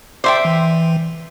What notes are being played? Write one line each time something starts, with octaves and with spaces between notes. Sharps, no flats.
C5 D5 E5 G5 C6 D6
E3